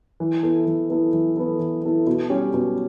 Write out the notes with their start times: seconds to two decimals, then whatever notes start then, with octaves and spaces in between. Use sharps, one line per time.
0.20 E3
0.43 B3 E4 A4
0.67 E3
0.89 B3 E4 A4
1.13 E3
1.37 B3 E4 A4
1.59 E3
1.83 B3 E4 A4
2.07 B2
2.30 G3 C#4 G4
2.54 B2